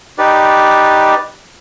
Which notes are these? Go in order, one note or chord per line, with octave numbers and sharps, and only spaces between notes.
D#4 G4 B4 D5